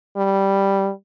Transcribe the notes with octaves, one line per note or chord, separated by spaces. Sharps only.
G3